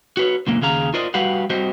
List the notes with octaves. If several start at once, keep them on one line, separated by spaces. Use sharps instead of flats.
F#4 B4 C#5
C#2 F#2 A#2 D3 A#3
D#2 C#3 G#4 F5 A#5
F4 A#4 C5 D5 D#5
G3 F#4 G4 B4 F5 F#5
G3 C4 F#4 G4 C5 D#5